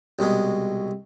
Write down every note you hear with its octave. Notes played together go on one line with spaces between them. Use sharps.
C2 B2 G#3